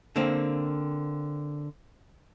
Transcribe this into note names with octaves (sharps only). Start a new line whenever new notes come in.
D3 A#3 C4